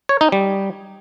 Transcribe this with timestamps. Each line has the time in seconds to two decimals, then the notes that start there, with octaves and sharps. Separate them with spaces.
0.09 C#5
0.21 D#4
0.32 G3